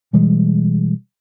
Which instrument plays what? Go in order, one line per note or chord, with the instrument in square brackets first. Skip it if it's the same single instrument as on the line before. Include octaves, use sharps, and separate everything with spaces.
[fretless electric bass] B2 E3 G3 G#3